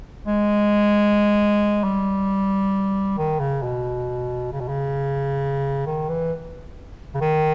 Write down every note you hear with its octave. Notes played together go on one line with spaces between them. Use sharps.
G#3
G3
D#3
C#3
B2
C#3
B2
C#3
D#3
E3
C#3
D#3